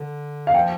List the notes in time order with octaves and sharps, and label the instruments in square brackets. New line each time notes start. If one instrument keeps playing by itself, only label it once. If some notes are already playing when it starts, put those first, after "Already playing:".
Already playing: [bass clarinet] D3
[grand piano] F5
[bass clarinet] F3 [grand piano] G5